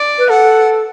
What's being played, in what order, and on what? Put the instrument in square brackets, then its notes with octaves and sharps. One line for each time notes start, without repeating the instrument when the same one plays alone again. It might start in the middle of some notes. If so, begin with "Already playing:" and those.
Already playing: [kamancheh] D5
[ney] B4
[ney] A4 [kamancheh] F#5